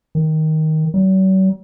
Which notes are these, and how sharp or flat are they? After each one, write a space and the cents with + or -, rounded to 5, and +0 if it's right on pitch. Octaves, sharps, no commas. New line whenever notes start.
D#3 +10
F#3 +45